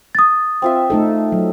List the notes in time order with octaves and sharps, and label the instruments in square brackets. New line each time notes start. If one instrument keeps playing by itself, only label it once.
[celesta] D#6 A6
[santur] C4 F4 E5
[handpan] A3 D#4 A4
F#3